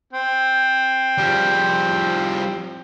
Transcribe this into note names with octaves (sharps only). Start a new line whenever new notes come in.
C4
F3 G3